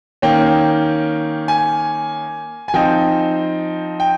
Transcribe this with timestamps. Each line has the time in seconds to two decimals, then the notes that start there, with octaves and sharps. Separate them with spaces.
0.22 D#3 A#3 C#4 G5
1.48 G#5
2.68 G#5
2.74 F3 C4 D#4 G5
4.00 G5